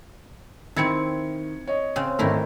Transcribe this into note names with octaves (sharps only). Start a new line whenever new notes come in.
D#3 C4 E4 G#6 C#7
C#5 D#5
C#3 C4
G#1 D#3 A3 E4 A#4